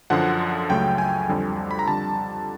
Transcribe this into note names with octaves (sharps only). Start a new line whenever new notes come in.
F#2 D3 F3 F#5
C#2 C#3 F#3 A3 G5
G#5
F2 D3 G3
B5
A#5
F2 D3 G3 A5